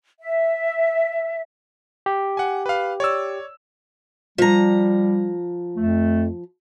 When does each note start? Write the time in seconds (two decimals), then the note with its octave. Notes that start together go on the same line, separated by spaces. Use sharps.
0.19 E5
2.06 G4
2.37 F#5 G#5
2.66 B4 F5
3.00 C#5 D5 E6
4.38 F3 G3 A#5
5.77 F2 A3